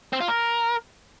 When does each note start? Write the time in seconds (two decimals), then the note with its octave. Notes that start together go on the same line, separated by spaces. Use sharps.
0.13 C4
0.21 F4
0.28 A#4